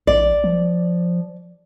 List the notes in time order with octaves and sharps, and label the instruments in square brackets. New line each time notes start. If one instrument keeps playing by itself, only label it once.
[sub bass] A#1 [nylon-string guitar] D5
[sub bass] F3